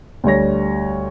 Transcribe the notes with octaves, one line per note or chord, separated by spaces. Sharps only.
D2 G3 C#5 A#6